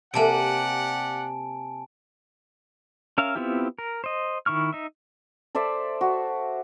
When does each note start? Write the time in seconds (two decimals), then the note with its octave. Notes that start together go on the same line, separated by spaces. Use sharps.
0.14 C3 A#3 G4 D5 F#5 G#5 A5 D7
3.18 C#4 A#4 E5 F5
3.36 B3 C4 E4 F4 G4
3.79 A#4
4.04 C5 D#5
4.46 D#3 E4 C#6 F6
4.73 D#4 E5
5.55 A4 C5 D5 E5
6.01 F#4